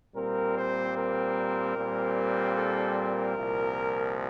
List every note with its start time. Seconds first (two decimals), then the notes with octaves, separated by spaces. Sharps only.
0.15 A#2 G3 C4 A#4
0.55 C5
0.95 A#4
1.75 A#2 G3 C4
2.56 A4
2.96 A#4
3.36 C2 A#2 F3